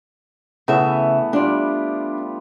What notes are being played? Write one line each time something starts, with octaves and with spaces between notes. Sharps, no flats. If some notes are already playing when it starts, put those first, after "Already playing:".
C#3 E3 A3 B3 E5
G3 D4 F4